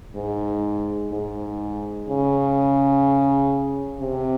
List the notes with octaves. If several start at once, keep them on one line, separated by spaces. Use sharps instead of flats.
G#2
G#2
C#3
C3